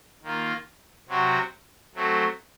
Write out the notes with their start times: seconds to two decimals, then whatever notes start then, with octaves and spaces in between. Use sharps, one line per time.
0.23 D#3 A#3 F4
1.08 C3 F#3 C4 F#4
1.95 F#3 A3 C4